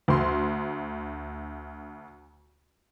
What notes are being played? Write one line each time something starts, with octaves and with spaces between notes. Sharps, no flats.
D2 C6